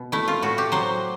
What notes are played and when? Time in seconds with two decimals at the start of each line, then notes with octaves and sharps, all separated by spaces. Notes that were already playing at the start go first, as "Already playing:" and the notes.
Already playing: B2
0.12 A3 E4
0.28 F4
0.42 A2 F#4
0.58 G4
0.72 F#3 C5